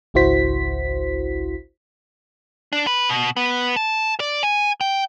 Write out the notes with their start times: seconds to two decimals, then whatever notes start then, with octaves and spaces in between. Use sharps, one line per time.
0.14 G#1 C#2 E4 F#4 C5 B6
2.73 D4
2.87 B4
3.09 B2
3.37 B3
3.76 A5
4.20 D5
4.43 G#5
4.81 G5